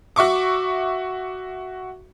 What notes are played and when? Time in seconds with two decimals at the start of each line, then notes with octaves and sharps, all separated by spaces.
0.16 F#4 E5 C#6 D6